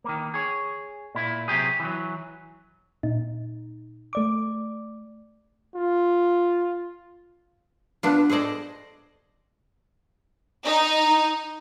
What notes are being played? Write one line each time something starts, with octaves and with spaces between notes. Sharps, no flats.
D#3 A#3
G#4 C#5
A#2 E4
C3 F#3 G4 G#4
E3 F#3
A#2 D#4
A3 D5 D6
F4
B3 D4 F4
G#4 A4 C5 D5 D#5
D#4